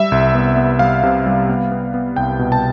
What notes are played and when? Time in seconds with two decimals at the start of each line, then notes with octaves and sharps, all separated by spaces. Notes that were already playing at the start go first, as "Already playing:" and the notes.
Already playing: G3 E5
0.12 C2
0.34 B3
0.57 B3
0.79 G3 F5
1.03 C3
1.26 G3
1.49 B3
1.72 B3
1.94 B3
2.16 C2 G5
2.39 B2
2.52 A5